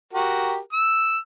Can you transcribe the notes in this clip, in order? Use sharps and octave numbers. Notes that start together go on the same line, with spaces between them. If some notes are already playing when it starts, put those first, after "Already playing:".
F#4 G4 A#4
E6